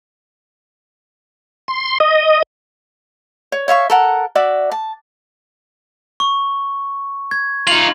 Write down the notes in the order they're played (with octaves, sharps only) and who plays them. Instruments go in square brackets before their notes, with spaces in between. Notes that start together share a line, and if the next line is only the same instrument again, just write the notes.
[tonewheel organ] C6
D#5
[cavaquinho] C#5
C#5 E5 F5 C#6
A4 A#4 F#5
F#4 D5 E5 D6
A5
[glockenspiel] C#6
G#6
[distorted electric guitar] D#4 F4 [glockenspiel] F#7